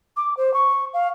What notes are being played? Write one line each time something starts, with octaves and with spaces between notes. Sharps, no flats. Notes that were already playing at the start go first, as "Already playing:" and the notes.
D6
C5
C#6
F5